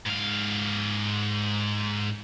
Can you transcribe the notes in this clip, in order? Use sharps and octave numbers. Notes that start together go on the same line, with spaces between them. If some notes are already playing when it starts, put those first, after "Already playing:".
G#2 F5